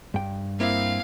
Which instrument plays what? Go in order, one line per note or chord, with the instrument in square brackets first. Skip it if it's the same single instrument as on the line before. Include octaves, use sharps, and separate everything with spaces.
[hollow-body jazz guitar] G2 G5
[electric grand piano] A#3 C4 E4 [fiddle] F5